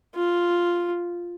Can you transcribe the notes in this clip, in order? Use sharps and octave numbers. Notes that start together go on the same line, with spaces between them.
F4